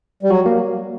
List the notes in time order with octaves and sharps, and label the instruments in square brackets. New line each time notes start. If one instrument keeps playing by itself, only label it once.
[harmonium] G3
[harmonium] F#3 [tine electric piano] F#4
[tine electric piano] A#3